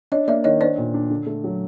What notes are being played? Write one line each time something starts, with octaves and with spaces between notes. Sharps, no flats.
D4 C#5 D#5
A#3 D5 E5
D#3 C#5 D#5
D4 C5 D5
A#2
D4
D3
A3
F#3